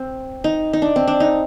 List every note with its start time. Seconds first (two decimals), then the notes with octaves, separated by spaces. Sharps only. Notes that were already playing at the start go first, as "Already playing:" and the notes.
Already playing: C4
0.44 D#4
0.73 D#4
0.82 D4
0.96 C4
1.08 D4
1.20 D#4